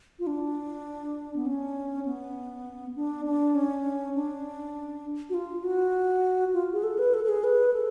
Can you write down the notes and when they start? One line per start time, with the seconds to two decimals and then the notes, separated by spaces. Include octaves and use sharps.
0.19 F4
0.27 D4
1.36 B3
1.46 C#4
2.05 B3
2.96 D4
3.25 D4
3.55 C#4
4.15 D4
5.30 F#4
5.34 F4
5.64 F#4
6.53 F4
6.73 G#4
6.83 A4
6.99 B4
7.14 A4
7.24 A4
7.28 G#4
7.44 B4
7.73 A4